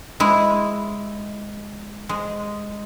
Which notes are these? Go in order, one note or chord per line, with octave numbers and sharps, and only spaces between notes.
G#3 E4
G#3